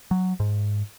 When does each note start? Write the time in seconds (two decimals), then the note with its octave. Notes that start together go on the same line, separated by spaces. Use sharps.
0.11 F#3
0.40 G#2